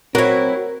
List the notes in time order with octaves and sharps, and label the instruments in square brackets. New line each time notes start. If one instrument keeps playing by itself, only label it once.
[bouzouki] F#3 E4 [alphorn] C4 [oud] F#4 C#5 [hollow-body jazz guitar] A#4